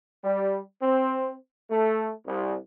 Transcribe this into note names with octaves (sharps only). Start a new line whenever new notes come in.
G3
C4
A3
C2